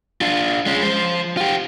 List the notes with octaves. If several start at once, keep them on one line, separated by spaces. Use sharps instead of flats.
D4 F4
G#3 C#4
F3 C5
F4 G4